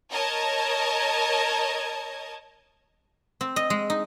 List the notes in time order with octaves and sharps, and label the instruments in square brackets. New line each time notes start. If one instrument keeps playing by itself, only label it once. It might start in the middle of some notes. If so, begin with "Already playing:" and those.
[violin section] A#4 C#5 D#5 A5 G#6
[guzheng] C4
D#5
G#3
D#4